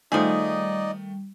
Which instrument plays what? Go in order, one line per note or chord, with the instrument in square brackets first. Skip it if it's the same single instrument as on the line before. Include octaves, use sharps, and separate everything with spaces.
[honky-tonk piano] D#3 A3 [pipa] F3 G#4 [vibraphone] G3 [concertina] D#4 D5 D#5